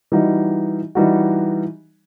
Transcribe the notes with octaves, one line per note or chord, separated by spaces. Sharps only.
E3 G3 D#4 F#4
E3 G3 D#4 F#4